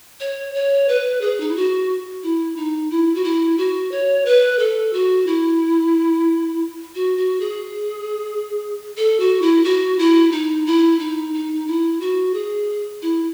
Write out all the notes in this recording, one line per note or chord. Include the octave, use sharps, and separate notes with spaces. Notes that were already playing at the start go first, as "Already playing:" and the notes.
C#5
C#5
B4
G#4
D#4
E4
F#4
E4
D#4
E4
F#4
E4
F#4
C#5
B4
A4
F#4
E4
F#4
F#4
G#4
A4
F#4
E4
F#4
E4
D#4
E4
D#4
D#4
E4
F#4
G#4
E4